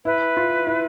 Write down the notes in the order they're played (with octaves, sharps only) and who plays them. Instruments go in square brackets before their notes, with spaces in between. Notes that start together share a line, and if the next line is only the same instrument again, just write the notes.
[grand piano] E4 [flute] B4
[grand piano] F4
E4